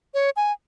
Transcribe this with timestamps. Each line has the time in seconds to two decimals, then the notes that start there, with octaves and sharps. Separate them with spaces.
0.14 C#5
0.36 G#5